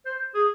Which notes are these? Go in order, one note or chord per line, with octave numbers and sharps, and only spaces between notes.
C5
G#4